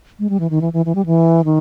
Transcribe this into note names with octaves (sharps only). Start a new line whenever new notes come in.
G#3
G3
E3
D#3
E3
E3
E3
G3
E3
D#3